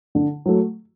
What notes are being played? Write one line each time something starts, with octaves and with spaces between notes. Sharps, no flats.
D3
F#3 A3